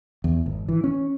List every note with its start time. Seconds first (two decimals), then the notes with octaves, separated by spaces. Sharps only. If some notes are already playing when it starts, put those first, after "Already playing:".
0.24 E2
0.46 G#1
0.68 E3
0.84 C#4